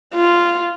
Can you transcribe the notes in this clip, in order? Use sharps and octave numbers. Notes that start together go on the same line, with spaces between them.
F4